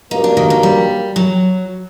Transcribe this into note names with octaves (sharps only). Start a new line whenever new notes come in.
G2 F#3 A#3 D#4
D4
D#3
D#3
G3
F#3